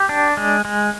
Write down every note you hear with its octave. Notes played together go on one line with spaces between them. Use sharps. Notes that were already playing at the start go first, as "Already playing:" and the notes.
Already playing: G4
D4
G#3
G#3